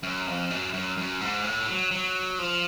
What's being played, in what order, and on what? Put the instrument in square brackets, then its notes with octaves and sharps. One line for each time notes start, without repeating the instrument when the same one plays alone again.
[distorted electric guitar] F#2
F2
F#2
F#2
F#2
G#2
A2
F#3
F#3
F3